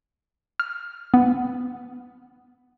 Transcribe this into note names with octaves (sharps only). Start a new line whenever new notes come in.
F6
B3